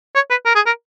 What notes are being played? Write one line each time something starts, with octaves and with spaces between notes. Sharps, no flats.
C#5
B4
A#4
G#4
A#4